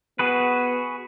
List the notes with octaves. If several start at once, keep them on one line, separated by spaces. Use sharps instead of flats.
B3 F#4 G#4 B4